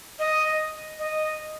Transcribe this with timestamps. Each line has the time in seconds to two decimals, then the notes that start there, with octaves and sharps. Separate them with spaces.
0.19 D#5
0.99 D#5